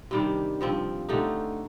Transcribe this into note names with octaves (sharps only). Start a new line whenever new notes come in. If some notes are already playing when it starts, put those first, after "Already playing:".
C3 D#3 G3 D4
G2 F3 C4
D3 A3 D#4 G4